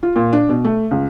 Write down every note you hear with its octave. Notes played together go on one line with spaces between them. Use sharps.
F4
A#2
D4
B2
A3
C#2